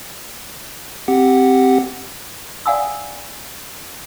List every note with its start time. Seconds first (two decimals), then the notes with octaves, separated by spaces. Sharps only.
1.08 C4 G4 F#5
2.66 D5 F5 F#5 G#5 D#6 E6